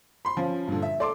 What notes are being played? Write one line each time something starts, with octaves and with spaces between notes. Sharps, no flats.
B5 C6
F3 C#4
G2 A#2 D3
E5
A4 D5 C6 D6